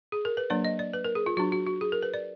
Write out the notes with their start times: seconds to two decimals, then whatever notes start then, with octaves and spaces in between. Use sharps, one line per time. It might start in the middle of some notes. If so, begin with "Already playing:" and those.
0.12 G#4
0.25 A#4
0.37 B4
0.50 F#3 A#3 D4 D5
0.65 D#5
0.79 D5
0.93 B4
1.04 A#4
1.15 G#4
1.26 F4
1.37 F#3 D4 F#4
1.52 F#4
1.66 F#4
1.81 G#4
1.92 A#4
2.02 B4
2.14 D5